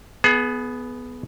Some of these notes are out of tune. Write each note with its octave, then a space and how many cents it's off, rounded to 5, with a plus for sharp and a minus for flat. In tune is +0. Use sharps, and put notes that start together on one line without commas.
B3 +0 G#4 +30